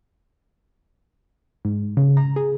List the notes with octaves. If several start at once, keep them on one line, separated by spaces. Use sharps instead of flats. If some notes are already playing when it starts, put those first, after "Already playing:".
G#2
C#3
A#5
G#4